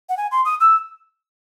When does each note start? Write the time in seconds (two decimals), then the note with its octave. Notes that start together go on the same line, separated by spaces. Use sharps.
0.09 F#5
0.17 G#5
0.31 C6
0.45 D#6
0.60 E6